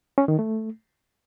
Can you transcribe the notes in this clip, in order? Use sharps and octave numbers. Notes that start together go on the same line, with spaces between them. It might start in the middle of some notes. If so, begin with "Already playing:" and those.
C#4
D#3
A3